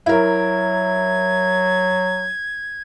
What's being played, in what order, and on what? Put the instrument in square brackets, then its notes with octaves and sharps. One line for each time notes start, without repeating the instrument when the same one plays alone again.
[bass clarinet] F#3 [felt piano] E4 A#4 [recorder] G#6